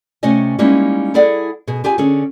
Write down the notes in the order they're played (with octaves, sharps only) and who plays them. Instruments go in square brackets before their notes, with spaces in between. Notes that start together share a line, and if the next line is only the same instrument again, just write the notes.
[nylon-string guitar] C3 A3 C#4 C#5 D#5 G#5
G3 G#3 A#3 C#4 D#4 E4
E4 G#4 A4 D5 F#5
B2 G#4
F4 G4 G#4 G#5
D3 C#4 G#4